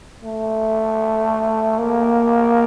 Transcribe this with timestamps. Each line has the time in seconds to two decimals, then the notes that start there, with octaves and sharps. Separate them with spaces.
0.24 A3
1.78 A#3